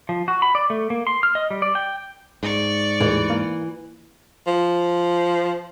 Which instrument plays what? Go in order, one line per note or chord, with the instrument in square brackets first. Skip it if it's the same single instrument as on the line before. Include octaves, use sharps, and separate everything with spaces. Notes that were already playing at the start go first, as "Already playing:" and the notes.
[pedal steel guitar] F3
F#4
B5
D5
A3
A#3
C6
F6
D#5
G3
D5
G5
[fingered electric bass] G#2 [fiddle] D5 C#6
[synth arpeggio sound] D#2 A2 G#3 [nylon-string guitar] E3
[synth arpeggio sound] A#3
[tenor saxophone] F3